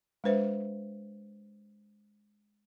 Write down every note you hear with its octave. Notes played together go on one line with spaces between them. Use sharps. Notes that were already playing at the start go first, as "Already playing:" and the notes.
G#3 D4 B4 C5 E5